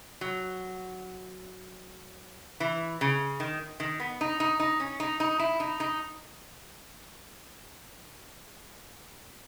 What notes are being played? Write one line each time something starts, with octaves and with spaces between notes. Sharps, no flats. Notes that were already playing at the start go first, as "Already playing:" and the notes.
F#3
E3
C#3
D#3
D#3
B3
D#4
D#4
D#4
C#4
D#4
D#4
E4
D#4
D#4